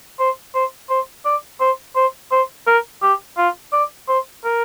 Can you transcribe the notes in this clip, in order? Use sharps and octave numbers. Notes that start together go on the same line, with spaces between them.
C5
C5
C5
D5
C5
C5
C5
A#4
G4
F4
D5
C5
A#4